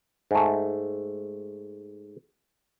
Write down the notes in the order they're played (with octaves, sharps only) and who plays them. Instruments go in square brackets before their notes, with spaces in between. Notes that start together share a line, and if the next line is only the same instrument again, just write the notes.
[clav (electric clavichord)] G#2 A3